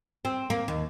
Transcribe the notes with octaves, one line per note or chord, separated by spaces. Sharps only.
C4
A#3
D#2